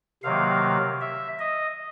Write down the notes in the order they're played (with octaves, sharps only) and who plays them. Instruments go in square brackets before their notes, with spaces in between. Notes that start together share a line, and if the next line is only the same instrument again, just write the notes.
[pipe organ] C3 D#3 F#3 A#3 F5
E5
D#5